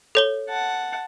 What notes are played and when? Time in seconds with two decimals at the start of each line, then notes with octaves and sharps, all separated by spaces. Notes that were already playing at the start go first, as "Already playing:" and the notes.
0.15 A4 C#5 G7
0.48 F#5 A5